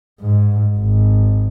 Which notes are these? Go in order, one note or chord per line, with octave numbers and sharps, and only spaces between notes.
G#2
G#1